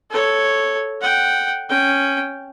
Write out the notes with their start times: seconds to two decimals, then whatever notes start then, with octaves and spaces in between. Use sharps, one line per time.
0.10 A4 C#5
1.01 F#5 G5
1.70 C#4 G5